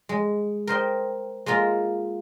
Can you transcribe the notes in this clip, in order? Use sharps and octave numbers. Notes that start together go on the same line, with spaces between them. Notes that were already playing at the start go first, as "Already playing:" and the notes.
G#3
A#4 C5 D#5 G5
G#3 A#3 F4 A#4